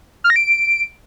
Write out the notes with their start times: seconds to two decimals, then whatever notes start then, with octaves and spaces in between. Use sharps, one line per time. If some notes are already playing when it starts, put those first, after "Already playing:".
0.24 F6
0.30 A#6
0.36 D7